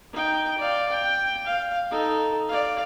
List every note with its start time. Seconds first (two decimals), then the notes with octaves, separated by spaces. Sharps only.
0.13 D#4 G5
0.58 D5 F5
0.89 G5
1.46 F5
1.91 D#4 A4
2.49 D5 F5